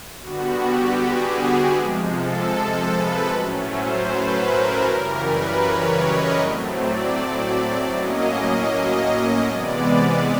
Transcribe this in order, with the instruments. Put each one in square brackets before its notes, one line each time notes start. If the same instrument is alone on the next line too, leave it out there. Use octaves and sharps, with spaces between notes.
[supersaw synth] D3 G3 B3 F#4
G4
G#4
G#4
C3 F3 G#3
A4
B4
A2 F#3 A3 C#4
C5
B4
A#4
F#2 C#3 E3 G3 A#4
B4
C#5
D#5
A2 F#3 A3 C4
D5
A2 F#3 A#3 C#4 D#5
D#5
C3 E3 G#3 B3 D5